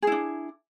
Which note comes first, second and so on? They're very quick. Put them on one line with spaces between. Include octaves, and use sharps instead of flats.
G#4 E4 D4